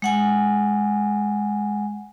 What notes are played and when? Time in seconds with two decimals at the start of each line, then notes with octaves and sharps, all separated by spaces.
0.02 G#3 F#5 G#5